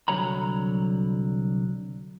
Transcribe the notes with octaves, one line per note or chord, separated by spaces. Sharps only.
C2 D3 F#3 C#5 A#5 B5